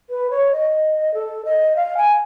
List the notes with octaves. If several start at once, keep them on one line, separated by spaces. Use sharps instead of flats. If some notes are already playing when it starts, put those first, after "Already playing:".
B4
C#5
D#5
A4
D#5
F5
G#5